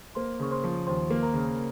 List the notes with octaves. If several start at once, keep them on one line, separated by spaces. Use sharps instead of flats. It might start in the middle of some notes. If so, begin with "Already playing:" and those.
A#3 C5 C6
C#3 C#6
C5 C6
F3
D#2 C5 C6
A#3
A#4 A#5
C#3